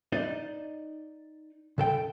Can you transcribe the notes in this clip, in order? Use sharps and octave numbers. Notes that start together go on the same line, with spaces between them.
D#4 D5 D#5
C#3 A4 G5